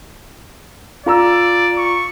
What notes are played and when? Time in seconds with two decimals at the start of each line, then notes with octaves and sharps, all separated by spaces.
1.06 F4 D5 A#5 E6
1.78 C#6